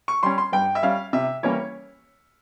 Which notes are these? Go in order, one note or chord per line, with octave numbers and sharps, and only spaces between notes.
C#6
G3 C#4 C6
C6
G2 G5
E5
G3 C#4 F5
C3 E5
E3 G3 A#3 C#4 C#5